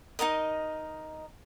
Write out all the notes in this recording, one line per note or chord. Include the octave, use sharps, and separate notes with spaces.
D#4 F4 A#4 D#5